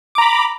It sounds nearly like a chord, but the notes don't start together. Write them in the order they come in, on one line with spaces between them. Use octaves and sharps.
D6 A#5 B5